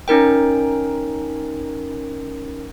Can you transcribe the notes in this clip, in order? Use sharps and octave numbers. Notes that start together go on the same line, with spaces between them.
C#4 D#4 A#4 G5